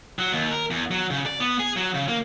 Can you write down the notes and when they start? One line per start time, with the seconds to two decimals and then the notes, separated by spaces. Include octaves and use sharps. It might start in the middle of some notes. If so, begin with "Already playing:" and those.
0.19 F#3
0.33 D#2
0.51 A#4
0.71 E2
0.91 F#3
1.10 C#3
1.26 D5
1.40 B3
1.59 G#4
1.77 F#3
1.94 C#3
2.08 A#3